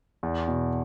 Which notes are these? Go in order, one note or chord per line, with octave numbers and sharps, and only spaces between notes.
E2
B2